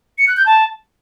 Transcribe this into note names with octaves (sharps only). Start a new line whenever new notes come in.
C#7
F#6
G6
A5